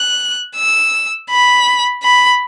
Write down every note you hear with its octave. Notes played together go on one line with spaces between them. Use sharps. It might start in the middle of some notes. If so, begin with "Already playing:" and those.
Already playing: F#6
E6
B5
B5